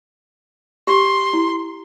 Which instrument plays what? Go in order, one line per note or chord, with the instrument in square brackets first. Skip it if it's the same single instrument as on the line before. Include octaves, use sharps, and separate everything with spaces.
[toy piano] G4 [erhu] C6
[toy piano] E4